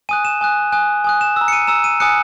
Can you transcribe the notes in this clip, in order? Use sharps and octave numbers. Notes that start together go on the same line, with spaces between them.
G#5 D#6 F#6 D#7
E7
G#5 D#6 F#6
G#5 D#6 F#6
G#5 D#6 F#6
E7
A#5 E6
C#7
D#7
A#5 E6 E7
D#7
G#5 D#6 F#6 C#7